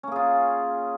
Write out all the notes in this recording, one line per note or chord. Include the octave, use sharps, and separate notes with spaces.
A#3 C#4 F4 G#4